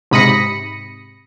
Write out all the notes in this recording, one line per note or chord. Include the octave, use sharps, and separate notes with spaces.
G#2 C3 B5 D#6 A#6 C#7